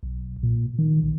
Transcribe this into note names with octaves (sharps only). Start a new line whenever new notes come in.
B1
A#2
D#3
A#1